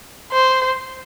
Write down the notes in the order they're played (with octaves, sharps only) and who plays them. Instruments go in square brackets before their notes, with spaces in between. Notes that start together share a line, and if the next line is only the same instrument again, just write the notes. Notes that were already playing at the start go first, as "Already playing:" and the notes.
[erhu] C5